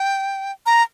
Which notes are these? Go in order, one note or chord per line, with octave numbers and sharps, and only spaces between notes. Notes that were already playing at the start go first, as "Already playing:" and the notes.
Already playing: G5
A#5